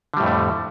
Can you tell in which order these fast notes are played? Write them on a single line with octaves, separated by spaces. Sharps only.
D3 G3 A2 F2 A3